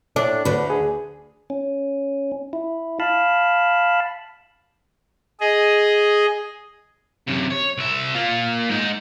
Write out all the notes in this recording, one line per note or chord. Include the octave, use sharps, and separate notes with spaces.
A2 D4
D2 D3 B4
G#4
C#4
E4
F5 A5 B5
G#4 D#5
F#2 C3
C#5
C2 E5
A#3 F4
G#2 D#4